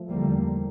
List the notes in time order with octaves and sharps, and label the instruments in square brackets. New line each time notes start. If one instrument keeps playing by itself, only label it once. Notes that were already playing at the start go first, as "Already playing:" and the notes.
Already playing: [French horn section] F3 A3
[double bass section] E2 D3 G3 A#3